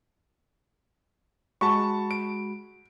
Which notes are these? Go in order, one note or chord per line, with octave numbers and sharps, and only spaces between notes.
G#3 F#4 A5 B5 C#6
D7